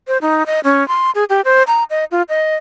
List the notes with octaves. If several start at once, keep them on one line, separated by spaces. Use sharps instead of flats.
C5
D#4
D#5
C#4
C6
G#4
G4
C5
A#5
D#5
F4
D#5